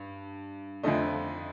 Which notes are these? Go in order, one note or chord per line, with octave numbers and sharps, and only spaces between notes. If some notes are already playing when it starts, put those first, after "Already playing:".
Already playing: G2
F2 D3 F3 A3 D#5